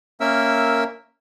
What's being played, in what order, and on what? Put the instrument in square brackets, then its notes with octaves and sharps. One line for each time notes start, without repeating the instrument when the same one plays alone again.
[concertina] A#3 C#4 A#4 E5 E6